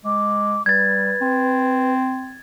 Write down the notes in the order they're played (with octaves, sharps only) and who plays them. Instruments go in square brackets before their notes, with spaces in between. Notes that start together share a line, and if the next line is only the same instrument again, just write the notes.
[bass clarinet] G#3 [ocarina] D6
[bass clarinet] G3 [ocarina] B4 [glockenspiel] G#6 A6
[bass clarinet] C4